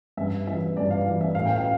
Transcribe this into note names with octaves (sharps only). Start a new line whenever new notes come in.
G2 E5
E3 E5
G2 D5
F5
E3
E5
A2 F5
G5
F5